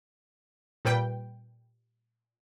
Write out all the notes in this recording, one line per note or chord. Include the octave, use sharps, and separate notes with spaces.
A#2 G3 B4 G5